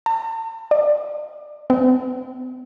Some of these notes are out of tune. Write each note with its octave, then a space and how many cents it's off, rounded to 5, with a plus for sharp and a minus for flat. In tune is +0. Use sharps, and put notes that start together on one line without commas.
A5 +40
D5 +25
C4 -45